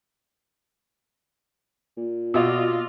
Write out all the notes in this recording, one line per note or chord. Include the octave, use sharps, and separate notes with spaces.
A#2
B2 F4 D5 D#5 E6